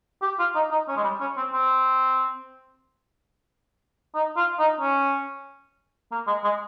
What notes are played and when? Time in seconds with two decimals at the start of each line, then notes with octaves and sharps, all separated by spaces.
0.22 G4
0.39 F4
0.55 D#4
0.71 D#4
0.88 C#4
0.97 G#3
1.04 G3
1.21 C#4
1.37 C4
1.53 C4
4.15 D#4
4.37 F4
4.59 D#4
4.81 C#4
6.11 A#3
6.27 G#3
6.44 G#3